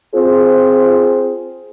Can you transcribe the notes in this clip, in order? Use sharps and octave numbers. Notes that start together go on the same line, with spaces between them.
C4 F4 G#4 C5